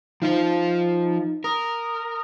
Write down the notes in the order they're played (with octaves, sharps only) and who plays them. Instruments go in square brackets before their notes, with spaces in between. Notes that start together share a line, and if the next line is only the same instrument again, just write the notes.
[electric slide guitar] F3 F4 C5 [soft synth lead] D#4
[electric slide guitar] A#4 [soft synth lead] D#6